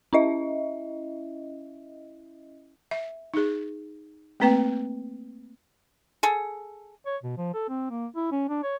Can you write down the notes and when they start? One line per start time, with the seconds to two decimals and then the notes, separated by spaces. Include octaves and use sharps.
0.13 C#4 E4 D#5 E5
2.91 E5
3.34 D#4 G#4
4.40 A3 A#3 C4 B4 G5
6.23 G#4 A4
7.06 C#5
7.23 B2
7.37 F3
7.54 A4
7.69 C4
7.90 A#3
8.16 E4
8.32 C#4
8.49 D4
8.64 C#5